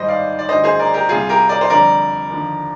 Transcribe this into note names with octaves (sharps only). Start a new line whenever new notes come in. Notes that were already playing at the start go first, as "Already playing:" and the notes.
Already playing: G#2 D#3 G3 C5 D#5
D5 F5
D5
D2 D3 G3 C5 D#5
G#4 C5
A#4 D5
G4 A#4
C2 C3 G3 F4 G#4
G4 A#4
A#4 D5
C5
F2 D3 G3 A#4 D5
D#2 D3 F3